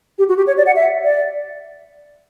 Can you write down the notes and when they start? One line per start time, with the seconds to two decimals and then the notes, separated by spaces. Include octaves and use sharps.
0.19 G4
0.29 F#4
0.37 G4
0.47 C#5
0.57 D5
0.66 F#5
0.76 E5
1.04 D5